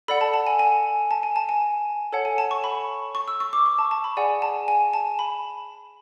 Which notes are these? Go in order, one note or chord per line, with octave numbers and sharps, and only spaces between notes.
A4 D5 F#5 B5
A5
A5
G#5
G#5
A5
G#5
A5
G#5
A4 C#5 F#5 A5
G#5
A5
C#6
B5
C#6
E6
C#6
D6
C#6
A5
A5
B5
G#4 D5 F#5 G#5
A5
G#5
A5
B5